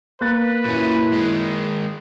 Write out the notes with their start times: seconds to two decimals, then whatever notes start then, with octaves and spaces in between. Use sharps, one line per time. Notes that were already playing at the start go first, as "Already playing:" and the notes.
0.21 A#3 B4 F#6 A6
0.65 F#2 A#2 C#4 E4
1.12 D#3 G#3